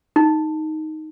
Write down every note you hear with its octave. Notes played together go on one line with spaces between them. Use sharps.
D#4